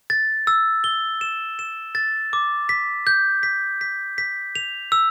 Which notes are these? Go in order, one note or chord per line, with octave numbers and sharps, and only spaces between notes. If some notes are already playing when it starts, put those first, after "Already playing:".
A6
E6
G7
E7
E7
A6
D6
B6
G6
B6
B6
B6
F7
E6